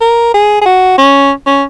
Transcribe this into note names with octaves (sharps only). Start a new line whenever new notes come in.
A#4
G#4
G#4
F#4
C#4
C#4